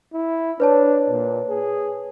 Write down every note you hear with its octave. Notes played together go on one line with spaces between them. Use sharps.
E4
D4 B4 C#5 A5
A#2
G#4